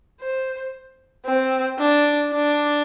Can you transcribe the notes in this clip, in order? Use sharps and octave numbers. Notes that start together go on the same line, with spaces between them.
C5
C4
D4
D4